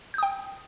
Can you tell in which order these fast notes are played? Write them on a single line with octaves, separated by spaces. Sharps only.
G6 D#6 G5